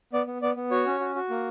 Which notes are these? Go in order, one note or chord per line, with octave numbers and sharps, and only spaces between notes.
B3 D5
B3
B3 D5
B3
F#4 C#5
C#4
F#4
F#4
A#3